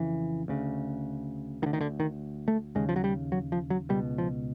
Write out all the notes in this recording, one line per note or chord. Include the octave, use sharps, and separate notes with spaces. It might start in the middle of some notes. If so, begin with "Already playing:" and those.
Already playing: F2 C#3 E3
D2 C#3
D2 D3 D#3
D#3
D3
D#3
A3
D#2 C#3 G#3
F3
F#3
G3
F#3
F3
F#3
C#2 B2 G3
F3